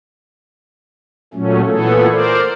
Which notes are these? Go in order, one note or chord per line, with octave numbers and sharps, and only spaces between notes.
A#2 F#3 A3 C#4
A#2 E3 A3 B3 G#4 A4
A#4 C5 D5